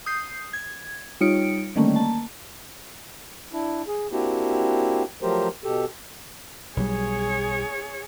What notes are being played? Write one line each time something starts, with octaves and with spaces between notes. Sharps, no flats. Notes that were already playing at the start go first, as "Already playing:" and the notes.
D#6 G6 C7
G#6
G3 D#4 F4 C#5 C#7 D7
D3 D#3 G3 A3 A#3 C#4
A#3 A5
D4 E4
G#4
A#3 C4 D4 E4 F#4 G4
F3 F#3 A3 G4 A#4 C5
B2 G4 A4
B1 F#3 G3 G#4 C#5